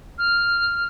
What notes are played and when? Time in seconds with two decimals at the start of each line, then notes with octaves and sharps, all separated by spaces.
0.18 F6